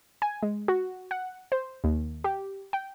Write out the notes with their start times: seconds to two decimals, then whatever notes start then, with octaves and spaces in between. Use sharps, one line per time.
0.22 G#5
0.42 G#3
0.68 F#4
1.11 F#5
1.52 C5
1.84 D#2
2.24 G4
2.73 G5